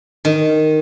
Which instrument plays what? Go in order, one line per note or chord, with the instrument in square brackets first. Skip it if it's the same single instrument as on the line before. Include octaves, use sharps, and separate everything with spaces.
[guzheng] D#3